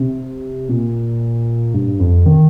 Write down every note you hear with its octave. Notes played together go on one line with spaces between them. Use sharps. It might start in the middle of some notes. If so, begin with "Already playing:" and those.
Already playing: C3
A#2
G2
F2
D#3